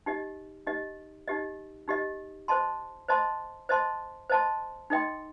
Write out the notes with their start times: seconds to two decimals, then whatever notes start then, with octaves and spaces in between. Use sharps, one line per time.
0.06 D#4 G4 D#5
0.66 D#4 G4 D#5
1.28 D#4 G4 D#5
1.88 D#4 G4 D#5
2.48 C5 D#5 A5 C6
3.08 C5 D#5 A5 C6
3.69 C5 D#5 A5 C6
4.30 C5 D#5 A5 C6
4.90 D#4 A4 D#5 G5 C6